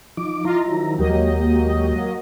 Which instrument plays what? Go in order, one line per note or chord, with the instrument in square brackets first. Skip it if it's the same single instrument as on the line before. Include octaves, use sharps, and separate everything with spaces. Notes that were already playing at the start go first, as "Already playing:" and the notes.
[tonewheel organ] F3 D#4 D6
[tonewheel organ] E4 A#5 [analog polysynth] F4 D#5
[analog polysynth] D#3 F3 F#3
[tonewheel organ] D#2 G#3 G4 [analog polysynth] F#3 A#3 D#5